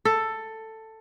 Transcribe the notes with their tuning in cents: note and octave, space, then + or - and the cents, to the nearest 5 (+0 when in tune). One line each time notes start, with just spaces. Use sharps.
A4 +10